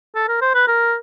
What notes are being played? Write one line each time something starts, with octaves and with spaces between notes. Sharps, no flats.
A4
A#4
C5
B4
A#4